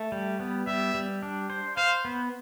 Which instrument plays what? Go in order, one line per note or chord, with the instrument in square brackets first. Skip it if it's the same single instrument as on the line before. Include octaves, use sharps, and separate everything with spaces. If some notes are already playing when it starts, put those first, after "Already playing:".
Already playing: [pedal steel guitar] A3
G3
B3
[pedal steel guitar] G3 [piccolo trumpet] E5
[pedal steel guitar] G3
D4
C5
[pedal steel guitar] C5 [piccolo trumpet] F5
[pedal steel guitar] B3